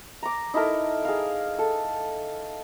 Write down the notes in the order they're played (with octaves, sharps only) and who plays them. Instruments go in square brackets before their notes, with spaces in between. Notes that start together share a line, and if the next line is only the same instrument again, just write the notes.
[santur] A#5 D6
D#4 E4 A4 A#4
G#4 F5
A4